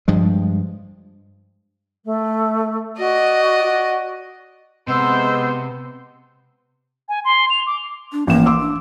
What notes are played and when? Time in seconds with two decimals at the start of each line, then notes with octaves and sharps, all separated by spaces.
0.08 G2 F3 G#3
2.05 A3
2.98 F#4 D5 D#5
3.63 F#4
4.88 C3 G#3 B3 C5 E6
7.09 G#5
7.25 C6
7.50 F7
7.67 D6
8.12 D4
8.27 A1 A#3 E7
8.46 C6 D6 E6
8.60 D4